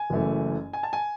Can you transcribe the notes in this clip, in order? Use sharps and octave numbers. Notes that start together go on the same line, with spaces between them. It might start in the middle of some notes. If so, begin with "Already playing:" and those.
Already playing: G#5
F#1 F#2 E3 A3
G#5
A5
G#5